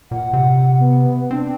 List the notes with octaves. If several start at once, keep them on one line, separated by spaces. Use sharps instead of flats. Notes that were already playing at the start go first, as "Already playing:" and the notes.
A#2 F#5
C3
B3
C4 D4